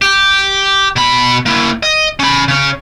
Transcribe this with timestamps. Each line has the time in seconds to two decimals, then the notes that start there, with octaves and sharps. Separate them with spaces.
0.02 G4
0.96 B2 B5
1.46 A#3 E4
1.83 D#5
2.20 C#4 B5
2.48 C#3 C#4